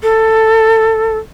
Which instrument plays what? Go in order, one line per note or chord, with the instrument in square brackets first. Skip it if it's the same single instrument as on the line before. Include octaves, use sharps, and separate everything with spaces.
[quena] A4